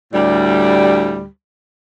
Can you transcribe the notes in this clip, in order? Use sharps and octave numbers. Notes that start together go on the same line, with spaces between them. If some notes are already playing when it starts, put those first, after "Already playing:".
D2 A2 G3